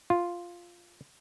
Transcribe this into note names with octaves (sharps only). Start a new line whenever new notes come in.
F4